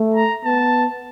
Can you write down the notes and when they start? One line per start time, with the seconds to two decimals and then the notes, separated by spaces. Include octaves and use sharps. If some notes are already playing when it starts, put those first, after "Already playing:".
Already playing: A3
0.15 A#5
0.45 B3 A5